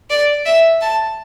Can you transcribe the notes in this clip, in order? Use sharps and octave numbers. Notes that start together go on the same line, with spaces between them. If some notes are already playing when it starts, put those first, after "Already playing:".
D5
E5
A5